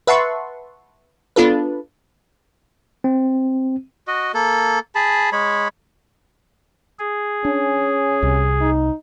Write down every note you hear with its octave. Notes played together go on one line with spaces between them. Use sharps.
B4 E5 F#5 A5 C6 C#6
B3 D4 F4 A4 B4
C4
F#4 D#5
A#3 A4
G#4 A5 B5
G#3 C#5 B5
G#4
C#4 D4
C2 C3
D#4